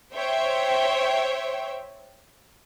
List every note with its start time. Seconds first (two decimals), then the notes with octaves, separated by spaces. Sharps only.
0.14 C5 C#5 E5 G5